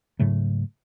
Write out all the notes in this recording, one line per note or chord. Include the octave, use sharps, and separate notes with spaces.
G#2 C#3 F#3 A3